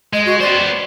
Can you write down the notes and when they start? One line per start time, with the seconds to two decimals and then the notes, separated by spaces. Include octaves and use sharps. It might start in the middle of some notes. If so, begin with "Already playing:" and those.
0.13 G#3 D#5
0.26 F#4
0.40 B3 C5 D5